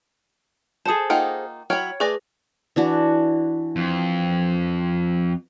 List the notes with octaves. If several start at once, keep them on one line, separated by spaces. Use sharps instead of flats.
G#4 A4 C5 A5 D#6
A#3 D#4 F4 F#5 G5
F#3 E4 C#5 G5 F6
A3 G#4 B4 D5 G#5 A#6
E3 D4 F#4
F2